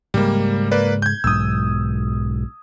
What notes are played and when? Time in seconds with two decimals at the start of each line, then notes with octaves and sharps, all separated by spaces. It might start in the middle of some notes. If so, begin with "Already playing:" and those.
0.14 G#2 C#3 G3 G#3 A#3
0.71 A#3 B4 D5
1.02 G6 G#6
1.24 B1 G#2 D#6 E6